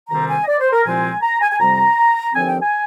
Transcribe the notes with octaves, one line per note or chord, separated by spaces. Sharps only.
D2 C3 D#3 G3 C4 A#5
G#5
D#5
D5
C5
A#4
C2 A#2 F3 G#3 C4 G#5
A#5
G#5
G#5
F2 C3 G3 C4 A#5
D#2 D3 F3 C4 G#5
G5
G#5